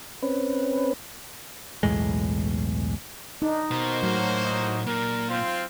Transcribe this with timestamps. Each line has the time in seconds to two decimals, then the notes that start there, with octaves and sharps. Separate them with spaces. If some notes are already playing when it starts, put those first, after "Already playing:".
0.22 C4 C#4 B4
1.83 B1 E2 A2 G#3
3.42 D4 D#4
3.71 B2 A#3 F#4 A#4 C5
4.03 A2 F#3
4.44 D#4
4.87 A#2 A#4
5.30 C4 F4 C5